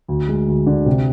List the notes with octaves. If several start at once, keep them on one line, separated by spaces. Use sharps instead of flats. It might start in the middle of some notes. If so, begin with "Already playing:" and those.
D2
G#3
D2
D3
C3